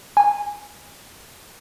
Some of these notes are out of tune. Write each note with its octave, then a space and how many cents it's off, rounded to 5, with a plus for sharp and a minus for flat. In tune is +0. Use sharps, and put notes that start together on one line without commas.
G#5 -15